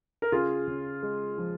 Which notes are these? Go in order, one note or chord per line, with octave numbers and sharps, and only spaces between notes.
A#4
C#3 F4 G#4
C#3
G#3
F3